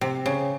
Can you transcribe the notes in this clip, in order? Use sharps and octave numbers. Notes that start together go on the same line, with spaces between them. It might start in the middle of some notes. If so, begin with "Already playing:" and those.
C3
C#3